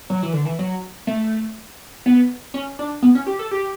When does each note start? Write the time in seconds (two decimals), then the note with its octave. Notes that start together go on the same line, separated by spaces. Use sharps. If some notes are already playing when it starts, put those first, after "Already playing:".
0.10 F#3
0.22 E3
0.33 D3
0.45 E3
0.59 F#3
1.07 A3
2.06 B3
2.54 C#4
2.79 D4
3.02 B3
3.15 C#4
3.26 G4
3.39 A4
3.51 G4